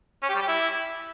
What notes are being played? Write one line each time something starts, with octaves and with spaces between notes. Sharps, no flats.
C#4
G4
G3
G4
E4